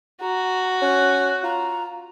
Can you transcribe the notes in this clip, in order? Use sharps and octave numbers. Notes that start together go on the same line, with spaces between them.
F#4 A#5
C#4 F#6
F4 A#5